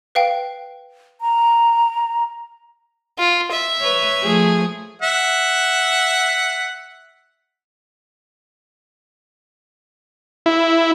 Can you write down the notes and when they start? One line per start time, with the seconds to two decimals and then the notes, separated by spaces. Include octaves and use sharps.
0.15 B4 F5 G5
1.21 A#5
3.19 F4
3.52 E5
3.81 B4 C#5
4.23 F3 A3 G#4
5.02 E5 F#5
10.46 E4